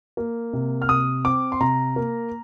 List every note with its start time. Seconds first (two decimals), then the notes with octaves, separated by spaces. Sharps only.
0.17 A#3
0.53 C3
0.82 F6
0.89 C3 D#6
1.25 C4 D6
1.52 C6
1.60 C3 A#5
1.96 A#3